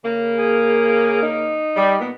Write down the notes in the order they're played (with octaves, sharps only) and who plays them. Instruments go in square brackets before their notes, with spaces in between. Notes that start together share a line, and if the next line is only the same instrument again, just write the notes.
[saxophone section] C#3 A#3
[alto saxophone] G#4
D#4
[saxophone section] G3
A#2 B3